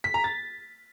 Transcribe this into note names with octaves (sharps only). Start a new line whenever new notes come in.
B6
A#5
A6